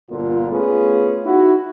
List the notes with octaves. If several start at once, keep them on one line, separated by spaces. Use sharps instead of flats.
G1 A#2 D3 F4
A3 B3 C#4 F4 G#4
D#4 E4 F#4